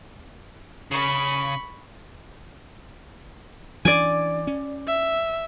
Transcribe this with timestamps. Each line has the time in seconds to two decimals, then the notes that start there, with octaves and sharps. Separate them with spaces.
0.91 C#3 B5 C#6
3.85 E3 C#4 D4 D5 G#5
4.47 C#4
4.87 E5